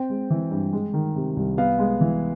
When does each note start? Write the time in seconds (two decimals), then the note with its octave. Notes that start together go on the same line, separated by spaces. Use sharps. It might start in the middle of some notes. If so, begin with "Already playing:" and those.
Already playing: C4 G5
0.10 G#3
0.30 E3
0.52 G2
0.73 G#3
0.94 D#3
1.15 C3
1.36 C2
1.58 B3 F5
1.79 G#3
2.01 E3